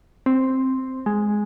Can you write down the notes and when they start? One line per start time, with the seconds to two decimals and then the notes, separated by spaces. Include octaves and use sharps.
0.26 C4
1.06 G#3